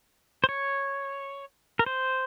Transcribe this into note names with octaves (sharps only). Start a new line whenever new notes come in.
C5
C#5
A#4
C5